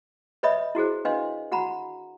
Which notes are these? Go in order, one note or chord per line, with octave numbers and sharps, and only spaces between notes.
B4 C#5 D#5 E5 B5 D#6
E4 F#4 G#4 C5
D4 B4 D#5 F5 C6
F#4 F#5 A#5 B5